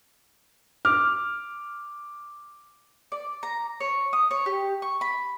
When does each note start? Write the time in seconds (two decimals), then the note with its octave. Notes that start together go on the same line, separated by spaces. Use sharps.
0.85 D6 F6
3.12 D5
3.43 A#5
3.80 C#5
4.13 D#6
4.31 C#5
4.46 G4
4.82 C#6
5.01 B5